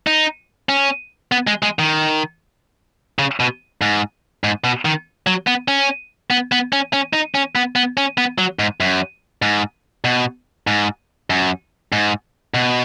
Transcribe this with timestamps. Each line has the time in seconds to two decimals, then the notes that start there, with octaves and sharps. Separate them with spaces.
0.07 D#4
0.69 C#4
1.32 B3
1.47 G#3
1.63 G#3
1.79 D#3
3.19 C#3
3.40 B2
3.81 G#2
4.44 G#2
4.64 B2
4.85 D#3
5.27 F#3
5.47 B3
5.68 C#4
6.30 B3
6.52 B3
6.73 C#4
6.93 C#4
7.13 D#4
7.35 C#4
7.55 B3
7.76 B3
7.97 C#4
8.18 B3
8.38 F#3
8.59 G#2
8.80 F#2
9.42 G#2
10.04 B2
10.67 G#2
11.30 F#2
11.92 G#2
12.54 B2